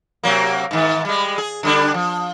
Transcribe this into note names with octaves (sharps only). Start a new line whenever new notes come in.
C3 F#3 A#3
G#2 D#3
G3 G#3
G#4
D3 G3 D4
F3